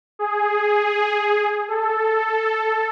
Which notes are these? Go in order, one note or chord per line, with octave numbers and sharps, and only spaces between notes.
G#4
A4